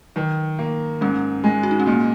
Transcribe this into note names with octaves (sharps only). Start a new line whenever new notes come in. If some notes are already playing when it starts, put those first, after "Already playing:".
D#3 F#3
A#3
G#2 C#4
G#3
F#4
D#4
C#4
A#2 A#3